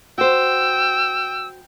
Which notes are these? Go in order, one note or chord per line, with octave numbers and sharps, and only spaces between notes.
F#4 C5 G5 E6